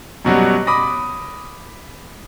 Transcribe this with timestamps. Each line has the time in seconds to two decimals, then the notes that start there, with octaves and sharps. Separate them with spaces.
0.25 F#2 B2 F#3 G3
0.67 B5 D6 D#6 A#6